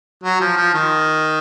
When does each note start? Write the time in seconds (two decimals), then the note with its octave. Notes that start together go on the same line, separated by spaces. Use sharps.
0.24 F#3
0.41 F3
0.57 F3
0.74 D#3